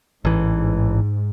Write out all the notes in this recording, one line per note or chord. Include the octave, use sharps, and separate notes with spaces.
A1 G#2 E3